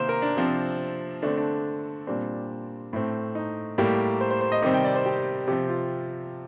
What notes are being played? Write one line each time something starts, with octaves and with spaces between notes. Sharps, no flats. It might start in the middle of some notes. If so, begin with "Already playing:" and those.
Already playing: C3 D#3 A#3 C5
A#4
D4
C3 F3 C4
D3 A3 C4 D4
D4
A#2 G3 C4 D4
A2 A3 C4
D#4
A2 G3 A#3 G4
C5
C5
C5
D#5
C3 D#3 G3 C4 D#5
G5
D5
C5
G4
C3 F3 C4 G4
F4